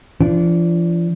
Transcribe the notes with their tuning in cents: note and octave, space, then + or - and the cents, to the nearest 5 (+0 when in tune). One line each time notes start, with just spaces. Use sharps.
F3 -40 D4 -20